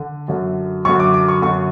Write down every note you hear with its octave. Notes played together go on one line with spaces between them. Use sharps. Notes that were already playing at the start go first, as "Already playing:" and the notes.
Already playing: D3
F#2 D3
F#2 D3 C#6
D6
D6
C#6
F#2 D3 C#6